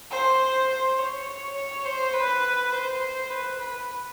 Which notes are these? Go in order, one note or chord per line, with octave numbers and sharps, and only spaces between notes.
C5
C5
C#5
C#5
C5
B4
C5
B4
B4